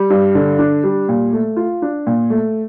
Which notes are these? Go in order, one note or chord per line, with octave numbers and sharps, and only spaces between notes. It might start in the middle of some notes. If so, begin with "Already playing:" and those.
Already playing: G3
G2
D3
D4
G3
A#2
A3
F4
D4
A#2
A3